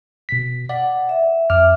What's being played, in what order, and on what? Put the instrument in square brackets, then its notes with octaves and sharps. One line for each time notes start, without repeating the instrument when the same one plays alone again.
[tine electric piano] B2 B6
[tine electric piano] D5 [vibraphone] F#5
[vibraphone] E5
[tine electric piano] F2 D6 F6 [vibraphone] E5